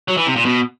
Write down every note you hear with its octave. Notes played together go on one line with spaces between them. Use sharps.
F#3
E3
C3
A#2
B2